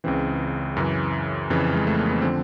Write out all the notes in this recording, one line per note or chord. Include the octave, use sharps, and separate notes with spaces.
C#2 C#3 E3 C4
F#2 C#3 E3
F2 C#3 E3
G#3
A3
A#3
B3
D3 F3 C4